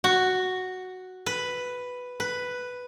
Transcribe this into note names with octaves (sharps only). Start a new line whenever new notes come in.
F#4
B4
B4